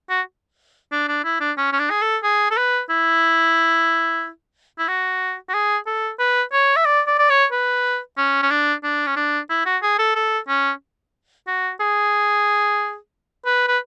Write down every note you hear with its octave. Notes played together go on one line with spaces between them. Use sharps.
F#4
D4
D4
E4
D4
C#4
C#4
D4
G#4
A4
G#4
A4
B4
E4
E4
F#4
F#4
G#4
A4
B4
C#5
E5
D5
D5
D5
C#5
B4
C#4
C#4
D4
D4
C#4
D4
E4
F#4
G#4
A4
A4
C#4
F#4
G#4
B4
B4